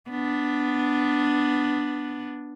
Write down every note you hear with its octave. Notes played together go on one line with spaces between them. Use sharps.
B3 D4